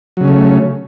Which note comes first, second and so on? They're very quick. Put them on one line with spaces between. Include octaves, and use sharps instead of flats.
F#3 C#3 C#4 A3